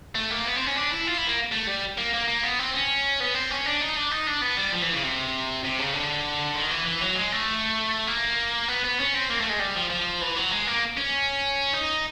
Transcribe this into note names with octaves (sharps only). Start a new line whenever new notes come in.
A3
A#3
B3
C4
C#4
D4
E4
F4
E4
A#3
A3
G3
A#3
A#3
A#3
B3
C4
C#4
B3
C4
C#4
D4
D#4
D4
D#4
D4
B3
G3
F3
E3
C#3
C3
C3
C#3
D3
D#3
E3
E3
F#3
G#3
A3
A#3
B3
B3
C#4
C4
A#3
A3
G#3
G3
F3
F3
E3
F#3
G#3
A#3
C#4
D#4